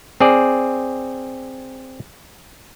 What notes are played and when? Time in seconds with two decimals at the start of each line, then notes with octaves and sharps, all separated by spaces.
0.20 C4 G#4 D5